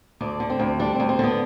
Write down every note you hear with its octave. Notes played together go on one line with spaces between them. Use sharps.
D2 D4
D3
C4
D2
G3 D4
C4
D2
C4
D3 B3